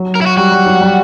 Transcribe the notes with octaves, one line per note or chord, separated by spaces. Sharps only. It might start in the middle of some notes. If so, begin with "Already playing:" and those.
Already playing: F#3
A#4
E4
F#4
G3 F#4
G3
F#3
G3